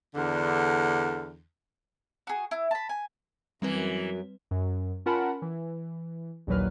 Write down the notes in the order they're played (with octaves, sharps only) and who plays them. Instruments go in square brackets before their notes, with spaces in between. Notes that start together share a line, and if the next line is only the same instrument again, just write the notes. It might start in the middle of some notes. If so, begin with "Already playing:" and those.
[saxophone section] E2 D3
[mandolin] F#4 G#4
E4
A5 B5
G#5
[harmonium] F#2 [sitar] E3 A#3 [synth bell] G3 C4 B4
[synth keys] F#2
C#4 F4 A#4 F#5 A5 B5
E3
A#1 D#2 A#2 F#3 B4 F6